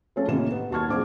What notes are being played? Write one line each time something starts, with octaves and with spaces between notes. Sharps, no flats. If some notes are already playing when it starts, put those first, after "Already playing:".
F3 A3 C#4 A4
A1 C3 D#3 A#3 E7
B3
D#2 F#3 A5 C#6 F6 G#6
A#1 C4 G#4 D6